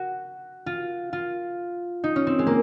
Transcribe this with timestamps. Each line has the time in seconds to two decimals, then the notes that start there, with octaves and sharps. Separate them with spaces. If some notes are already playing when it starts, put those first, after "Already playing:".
Already playing: F#4
0.66 F4
1.13 F4
2.04 D#4
2.16 C#4
2.27 C4
2.39 G#3
2.47 A#3